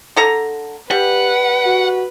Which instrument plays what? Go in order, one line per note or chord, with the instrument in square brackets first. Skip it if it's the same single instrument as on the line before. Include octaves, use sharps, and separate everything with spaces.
[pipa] D3 A4 A#5
[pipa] G3 [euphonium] G4 [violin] B4 [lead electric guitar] F#5
[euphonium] F#4